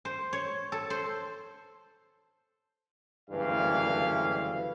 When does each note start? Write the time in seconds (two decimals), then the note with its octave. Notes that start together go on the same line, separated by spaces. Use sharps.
0.05 C5
0.33 C#5
0.72 A4
0.90 C5
3.30 F#1 D2 G2 E3 F5